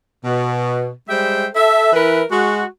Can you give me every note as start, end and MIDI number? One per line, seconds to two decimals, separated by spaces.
0.24 0.90 47
1.08 1.46 55
1.08 1.46 56
1.08 1.46 72
1.08 1.46 76
1.08 1.46 79
1.54 1.91 69
1.54 1.91 76
1.93 2.22 52
1.93 2.22 64
1.93 2.22 70
1.93 2.22 71
2.30 2.64 56
2.30 2.64 66